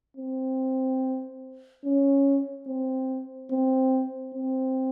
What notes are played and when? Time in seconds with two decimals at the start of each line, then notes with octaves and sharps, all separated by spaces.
0.17 C4
1.85 C#4
2.68 C4
3.52 C4
4.35 C4